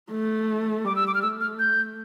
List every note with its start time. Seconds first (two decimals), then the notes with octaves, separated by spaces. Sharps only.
0.11 A3
0.85 G3 D6
0.96 E6
1.07 D6
1.14 F6
1.22 A3 E6
1.40 F6
1.59 G6